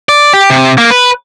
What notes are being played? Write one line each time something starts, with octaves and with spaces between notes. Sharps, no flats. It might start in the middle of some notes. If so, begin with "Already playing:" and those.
D5
G4
C3
A#3
B4